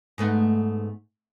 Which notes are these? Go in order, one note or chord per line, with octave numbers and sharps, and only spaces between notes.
G#2 A3 B3